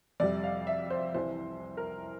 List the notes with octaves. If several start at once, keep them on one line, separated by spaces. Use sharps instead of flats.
F2 C3 G3 D5
F5
E5
C5
C2 C3 E3 C5
A#4